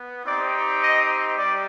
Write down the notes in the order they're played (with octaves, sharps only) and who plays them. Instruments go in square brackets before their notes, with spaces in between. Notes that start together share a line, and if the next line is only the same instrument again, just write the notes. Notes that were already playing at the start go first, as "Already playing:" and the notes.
Already playing: [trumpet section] B3
C4 D#4 G4 D5
D#5
G3 D5